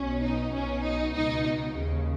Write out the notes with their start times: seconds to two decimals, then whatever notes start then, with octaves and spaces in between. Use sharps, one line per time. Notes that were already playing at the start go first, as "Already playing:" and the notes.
Already playing: B1 B2 C#4
0.22 D#4
0.53 B1 B2 C#4
0.84 D#4
1.14 C#2 B2 D#4
1.74 D#2 C#3